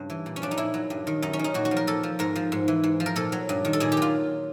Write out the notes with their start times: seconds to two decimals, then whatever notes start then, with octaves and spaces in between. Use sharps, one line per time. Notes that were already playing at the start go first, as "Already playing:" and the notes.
Already playing: G2 C#3
0.10 E3
0.26 A#2
0.36 C#4
0.42 F3 D4
0.51 D#4
0.58 A#2 E4
0.74 F#3
0.90 G2
1.07 D#3
1.22 F#2 D#4
1.33 C#4
1.39 D#3 D#4
1.54 A#2 F#4
1.65 F#4
1.71 F3
1.77 A#4
1.87 A#2 A4
2.03 F3
2.19 G#2 A#4
2.36 F3
2.52 G#2
2.68 E3
2.84 G#2
3.00 F3
3.06 A#4
3.16 A#2 A4
3.32 F#3
3.49 G2
3.65 D#3
3.73 A4
3.80 A#2 G#4
3.92 G4
3.97 F#3 F4